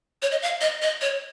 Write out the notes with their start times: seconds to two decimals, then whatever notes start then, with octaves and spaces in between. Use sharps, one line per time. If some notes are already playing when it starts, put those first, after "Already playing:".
0.22 C#5
0.32 D#5
0.42 F5
0.61 D#5
0.82 D#5
1.02 C#5